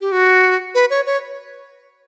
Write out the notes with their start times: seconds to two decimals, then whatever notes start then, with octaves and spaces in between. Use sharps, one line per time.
0.01 G4
0.12 F#4
0.75 B4
0.90 C#5
1.06 C#5